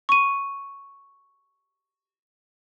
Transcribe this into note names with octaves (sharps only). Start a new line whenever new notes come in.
C#6 D#7